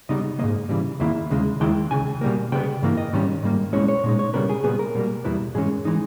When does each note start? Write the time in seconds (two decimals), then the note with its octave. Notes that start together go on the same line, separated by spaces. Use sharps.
0.09 C#3 G3 B3 D#4 D#5
0.39 G#2 D#3 A#3 D#5
0.69 C#3 E3 G3
0.99 E2 D#3 A#3 E4 E5
1.30 D#2 C#3 G#3
1.60 D#2 D#3 G#3 E4 G5
1.91 C#2 C#3 G#5
2.21 B2 G3 A#3
2.52 C#3 G3 B3 G5
2.82 G2 E3 A#3 E4
2.97 D#5
3.13 G#2 D#3 G3 C#4
3.43 G#2 G3 A#3
3.73 B1 B2 G#3 C#4 E4 C#5
3.88 C#5
4.04 A#2 G#3 D#4
4.19 C#5
4.34 C#3 G3 B3 A#4
4.49 G#4
4.63 A#2 G3 B3 G#4
4.79 A#4
4.95 B2 G3 A#3
5.24 E2 B2 G3 B3 E4
5.54 G#2 E3 G#3 C#4 G#4
5.85 E3 G#3 D#4